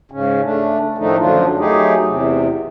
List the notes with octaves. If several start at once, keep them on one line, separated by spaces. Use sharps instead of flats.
G#2 C#3 C#4
A3 D4
A2 D#3 F3 A3 D4 D#4
F#2 D3 F3 F#3 D4 F4
F#3 A3 D#4 G4 G#4
E2 C3